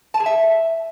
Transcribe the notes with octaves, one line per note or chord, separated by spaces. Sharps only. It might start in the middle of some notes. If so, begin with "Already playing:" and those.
A5
G#4
E5